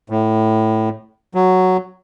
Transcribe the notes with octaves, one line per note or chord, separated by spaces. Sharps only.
A2
F#3